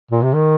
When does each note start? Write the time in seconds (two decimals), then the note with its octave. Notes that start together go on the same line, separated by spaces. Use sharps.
0.11 A#2
0.23 C3
0.34 D#3